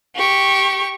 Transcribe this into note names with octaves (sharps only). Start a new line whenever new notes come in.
G4 C#6